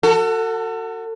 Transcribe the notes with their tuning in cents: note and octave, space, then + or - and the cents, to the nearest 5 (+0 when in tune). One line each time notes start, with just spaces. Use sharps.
F#4 +0 A4 +35